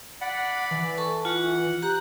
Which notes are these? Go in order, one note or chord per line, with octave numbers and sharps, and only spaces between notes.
D5 F#5 B5
E3
A4 A5 C#6
F4 F#5
G4 A#5 F#6